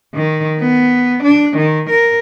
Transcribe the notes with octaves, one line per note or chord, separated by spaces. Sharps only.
D#3
B3
D4
D#3
A#4